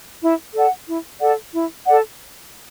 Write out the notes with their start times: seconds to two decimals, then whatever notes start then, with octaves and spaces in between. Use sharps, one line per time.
0.21 E4
0.54 A4 D5 F#5
0.87 E4
1.19 A4 D5 F#5
1.52 E4
1.85 A4 D5 F#5